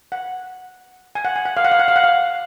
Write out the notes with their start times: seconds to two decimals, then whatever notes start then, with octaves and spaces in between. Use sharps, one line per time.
0.12 F#5
1.15 G#5
1.25 F#5
1.36 G#5
1.45 F#5
1.57 F5
1.65 F#5
1.72 F5
1.79 F#5
1.88 F5
1.96 F#5
2.04 F5